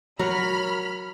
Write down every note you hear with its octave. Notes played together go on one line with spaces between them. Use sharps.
F#3 A#4 C#5 B5 F6